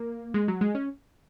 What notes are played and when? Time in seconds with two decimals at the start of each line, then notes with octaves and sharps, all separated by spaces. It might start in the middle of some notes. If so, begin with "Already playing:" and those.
Already playing: A#3
0.34 G#3
0.48 F#3
0.61 G#3
0.75 C#4